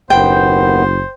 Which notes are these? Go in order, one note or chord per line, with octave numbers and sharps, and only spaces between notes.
F#1 D#2 B3 C5 G5